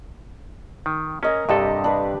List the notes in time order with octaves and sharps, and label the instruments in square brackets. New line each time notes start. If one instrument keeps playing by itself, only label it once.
[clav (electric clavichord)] D#3
[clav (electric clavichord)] C#4 [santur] A#4 D#5 G#5
[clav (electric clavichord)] G2 C3 A4 [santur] D4 G4 D#5
[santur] D4 B4